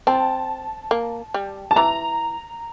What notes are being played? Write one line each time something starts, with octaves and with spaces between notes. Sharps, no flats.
C4 A5
A#3
G3
A5
E3 A#5